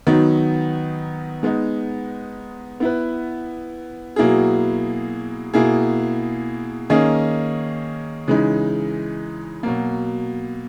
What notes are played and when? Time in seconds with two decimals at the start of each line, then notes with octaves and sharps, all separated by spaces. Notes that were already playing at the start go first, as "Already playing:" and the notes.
0.07 D#3 F#3 B3 D#4
1.43 G#3 B3 D#4
2.80 B3 E4 B4
4.16 B2 F#3 A#3 E4 G#4
5.54 B2 A#3 E4 G#4
6.90 D#3 A#3 C#4 G#4 D#5
8.28 C#3 E3 G#3 D#4
9.63 B2 F#3 A#3